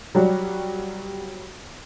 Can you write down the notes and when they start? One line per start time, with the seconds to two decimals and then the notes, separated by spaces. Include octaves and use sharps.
0.15 F#3 G3 F#4